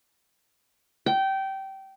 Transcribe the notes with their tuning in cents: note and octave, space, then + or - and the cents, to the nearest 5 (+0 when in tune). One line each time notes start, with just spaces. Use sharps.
G5 -20